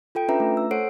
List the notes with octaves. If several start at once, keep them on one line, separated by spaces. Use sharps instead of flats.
F4 A4 G5 D7
C#4 D4 F4 B4 E5 A#5
A3
E6
A4 C5 C#5 F#5 C7 D7